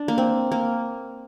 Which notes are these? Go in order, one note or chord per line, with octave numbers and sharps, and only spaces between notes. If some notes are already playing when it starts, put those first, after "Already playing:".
Already playing: D4
A#3
C4
A#3